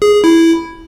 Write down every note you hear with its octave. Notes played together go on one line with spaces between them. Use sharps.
G#4
G#4
E4